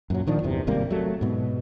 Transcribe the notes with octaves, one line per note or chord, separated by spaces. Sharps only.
F#2 A#2 F#3
A#2 D#3 F3 D4
G1 E2 C3
G#1 C3 G3 A#3
F#3 A3
G#2 B2